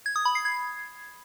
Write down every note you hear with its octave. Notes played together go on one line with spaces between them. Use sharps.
G#6
D#6
B5
C7
G#6